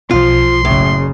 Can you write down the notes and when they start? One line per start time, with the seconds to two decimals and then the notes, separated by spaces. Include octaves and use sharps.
0.11 B1 B2 F3 F4 C6
0.65 F#1 A2 C#3